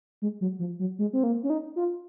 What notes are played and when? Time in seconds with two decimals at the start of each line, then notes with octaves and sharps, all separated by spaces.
0.22 G#3
0.41 F#3
0.59 F3
0.79 F#3
0.99 G#3
1.13 C4
1.23 A#3
1.43 C#4
1.50 D#4
1.76 F4